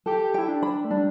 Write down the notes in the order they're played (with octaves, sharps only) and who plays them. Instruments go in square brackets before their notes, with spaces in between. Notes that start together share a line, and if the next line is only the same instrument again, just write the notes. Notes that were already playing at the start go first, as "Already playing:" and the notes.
[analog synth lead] G4 [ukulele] A4
[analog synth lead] E4 [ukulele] G5
[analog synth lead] D4
[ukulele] B5
[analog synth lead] A3
[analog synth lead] G3 [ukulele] D4